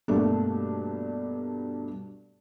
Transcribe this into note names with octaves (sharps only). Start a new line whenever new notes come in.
G2 B2 A3 A#3 D4